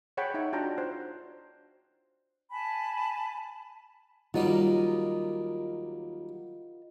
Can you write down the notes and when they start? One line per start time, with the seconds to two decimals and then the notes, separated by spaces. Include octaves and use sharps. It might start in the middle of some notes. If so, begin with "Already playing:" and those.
0.17 G#4 C#5 F#5 G5 B5
0.34 D#4 C#5 E5
0.53 D4 F4 F#4 G5 A5 A#5
0.78 C5
2.51 G#5 A5 B5
4.34 D#2 F#3 G3 F4 A#4 D#5